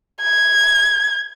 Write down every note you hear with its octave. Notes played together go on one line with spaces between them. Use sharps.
G#6